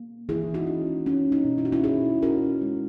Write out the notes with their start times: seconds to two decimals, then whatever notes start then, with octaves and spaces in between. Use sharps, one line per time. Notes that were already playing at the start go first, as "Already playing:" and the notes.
Already playing: A#3
0.29 E3 E4 G#4
0.54 D#4 F#4
0.67 C#4
1.06 A#3 C#4
1.32 D#4
1.45 B2
1.58 E4
1.65 F#4
1.72 C#4 E4
1.84 B2 E4 G#4
2.22 C#4 F#4 A#4
2.62 G#3